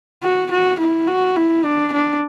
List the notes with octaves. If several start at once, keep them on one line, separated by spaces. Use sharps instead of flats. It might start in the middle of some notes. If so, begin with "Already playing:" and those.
F#4
F#4
E4
F#4
E4
D4
D4